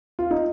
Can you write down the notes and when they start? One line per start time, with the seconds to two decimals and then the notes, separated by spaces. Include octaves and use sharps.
0.19 F4
0.31 D#4